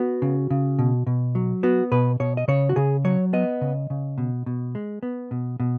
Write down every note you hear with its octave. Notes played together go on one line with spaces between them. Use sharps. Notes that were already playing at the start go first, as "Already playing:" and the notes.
Already playing: B3 F#4
C#3
C#3
B2
B2
F#3
B3 F#4
B2 B4
B2 C#5
D#5
C#3 C#5
F#4
C#3 G#4
F#3 C#5
B3 D#5
C#3
C#3
B2
B2
G#3
B3
B2
B2